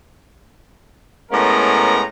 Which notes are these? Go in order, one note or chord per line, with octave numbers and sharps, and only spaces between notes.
A2 G#3 B3 C#4 A#4 A#5